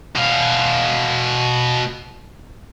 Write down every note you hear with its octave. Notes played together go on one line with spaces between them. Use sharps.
B2 F5